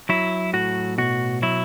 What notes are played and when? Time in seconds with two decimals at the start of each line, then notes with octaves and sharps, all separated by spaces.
0.09 F#3 E4
0.53 A2 F#4
0.98 B2 F#4
1.42 F#3 E4